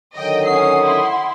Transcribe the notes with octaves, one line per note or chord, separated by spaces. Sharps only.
D3 D#3 F#3 D#5 G5
C#4 F#5 D#6 C7
E4 C6